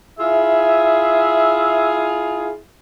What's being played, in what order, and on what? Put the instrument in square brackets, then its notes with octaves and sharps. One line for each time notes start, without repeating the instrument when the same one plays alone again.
[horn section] E4 F4 G#4 [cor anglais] E5